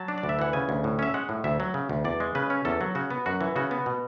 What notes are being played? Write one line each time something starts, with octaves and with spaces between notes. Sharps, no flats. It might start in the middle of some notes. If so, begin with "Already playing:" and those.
Already playing: F#3 A5
D4
D5
D2
E5
E3 F#5
C#3 G#5
D2
A2
C#4 E5
G#3 F#5
A2
D2 E5
F#3
C#3
D2
E2 D5
G#3
C#3 B4
C#4
E2 A4
F#3
C#3 F#4
B3
F#2 F#4
E3
C#3 F#4
B3
B2